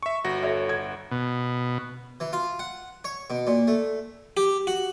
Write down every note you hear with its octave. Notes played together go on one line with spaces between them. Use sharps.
E5 C#6
G1 F#4 A#6
A4 C#5 E5
G#6
B2
E3
F4
F#5
C#5
B2
A#2
A3
G4
F#4